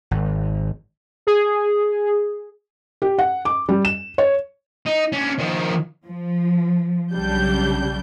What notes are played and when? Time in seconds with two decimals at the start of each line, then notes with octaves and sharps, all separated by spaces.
0.11 G#1
1.27 G#4
3.02 G4
3.19 F#5
3.45 D6
3.69 G3
3.85 E7
4.18 C#5
4.86 D#4
5.12 C#4 D4
5.39 D#3 F3
6.05 F3
7.14 B1 C#3 F#3 G3 D4 G6